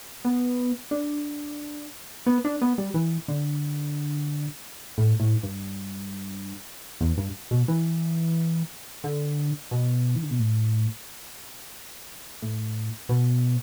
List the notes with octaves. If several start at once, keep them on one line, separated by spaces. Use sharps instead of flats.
B3
D4
B3
D4
B3
G3
E3
D3
A2
A2
G2
E2
G2
B2
E3
D3
B2
E3
D3
B2
A2
A2
B2